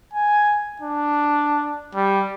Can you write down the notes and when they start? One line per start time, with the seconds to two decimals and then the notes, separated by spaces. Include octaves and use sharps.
0.13 G#5
0.81 D4
1.95 G3